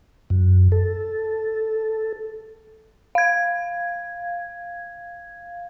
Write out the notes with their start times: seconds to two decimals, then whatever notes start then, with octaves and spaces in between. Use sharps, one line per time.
0.30 F#2
0.72 A4
3.15 F5 G#6